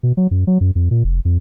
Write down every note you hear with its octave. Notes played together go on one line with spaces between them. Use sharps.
B2
F#3
F#2
F#3
F#2
F2
A#2
F1
F2